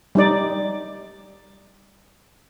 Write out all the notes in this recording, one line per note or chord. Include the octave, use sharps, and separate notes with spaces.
G3 D#4 D5